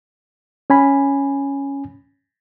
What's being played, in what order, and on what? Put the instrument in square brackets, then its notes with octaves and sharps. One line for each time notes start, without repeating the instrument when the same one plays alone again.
[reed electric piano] C#4 G#5 B5